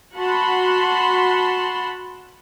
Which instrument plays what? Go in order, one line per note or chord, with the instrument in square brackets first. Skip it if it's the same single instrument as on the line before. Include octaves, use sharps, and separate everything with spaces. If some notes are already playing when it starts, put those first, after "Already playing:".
[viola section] F#4 F#5 A5 B5 C6